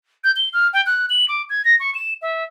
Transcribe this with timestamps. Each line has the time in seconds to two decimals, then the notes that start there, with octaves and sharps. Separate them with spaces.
0.24 G6
0.36 G7
0.53 F6
0.73 G5
0.86 F#6
1.10 F#7
1.29 D6
1.50 G#6
1.65 A#6
1.80 C#6
1.95 E7
2.22 E5